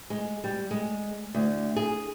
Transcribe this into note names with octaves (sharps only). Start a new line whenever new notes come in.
G#3
G3
G#3
D2
G#4